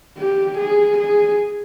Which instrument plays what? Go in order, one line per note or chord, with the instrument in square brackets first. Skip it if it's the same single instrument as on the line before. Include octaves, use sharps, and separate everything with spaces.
[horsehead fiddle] G4
G#4
G#4